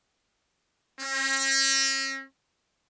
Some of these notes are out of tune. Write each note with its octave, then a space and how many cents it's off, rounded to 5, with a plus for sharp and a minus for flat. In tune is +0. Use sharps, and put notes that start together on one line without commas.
C#4 -45